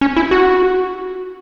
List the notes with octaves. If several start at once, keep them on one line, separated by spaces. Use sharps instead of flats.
C#4
E4
F#4